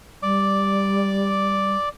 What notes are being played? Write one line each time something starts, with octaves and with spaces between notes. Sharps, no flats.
G3 D5 D6